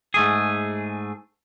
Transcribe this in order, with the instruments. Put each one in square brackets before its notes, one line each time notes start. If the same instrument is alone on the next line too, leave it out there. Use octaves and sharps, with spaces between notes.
[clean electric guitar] G#2 A3 G#4